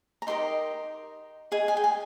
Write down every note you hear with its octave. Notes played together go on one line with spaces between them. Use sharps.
A#5
D#4 G4 A#4 D#5 C6
G#4 D#5 G#5
G#5
G5
G#5